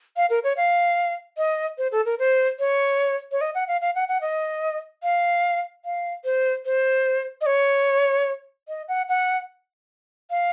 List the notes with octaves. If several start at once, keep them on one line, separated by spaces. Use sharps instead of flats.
F5
A#4
C#5
F5
D#5
C5
A4
A#4
C5
C#5
C#5
D#5
F#5
F5
F5
F#5
F#5
D#5
F5
F5
C5
C5
D#5
C#5
D#5
F#5
F#5
F5